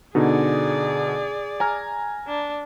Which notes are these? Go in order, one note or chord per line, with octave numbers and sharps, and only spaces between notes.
B2 D3 D#4 G#4 D5
G#5 A#5 F6
D4